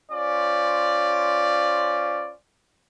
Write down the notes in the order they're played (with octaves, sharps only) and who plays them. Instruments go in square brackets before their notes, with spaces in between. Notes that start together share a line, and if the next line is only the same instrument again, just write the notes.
[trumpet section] C#4 F4 C5 D5